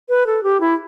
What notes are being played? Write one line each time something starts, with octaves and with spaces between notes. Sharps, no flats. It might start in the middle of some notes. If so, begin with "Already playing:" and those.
B4
A4
G4
E4